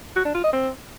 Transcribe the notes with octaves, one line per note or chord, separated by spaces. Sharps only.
F#4
D4
F4
D#5
C4